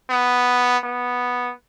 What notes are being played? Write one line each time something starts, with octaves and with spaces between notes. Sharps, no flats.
B3
B3